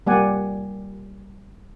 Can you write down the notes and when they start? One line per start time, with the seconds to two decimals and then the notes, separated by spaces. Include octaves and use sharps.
0.06 G3 A#3 G4 D5 F#5 G#5